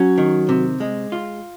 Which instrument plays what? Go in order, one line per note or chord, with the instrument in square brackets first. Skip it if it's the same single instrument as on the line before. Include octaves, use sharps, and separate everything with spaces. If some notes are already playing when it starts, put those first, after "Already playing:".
Already playing: [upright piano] F#3 F#4 [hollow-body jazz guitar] C#4
[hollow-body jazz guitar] D#3
C3
G#3
F4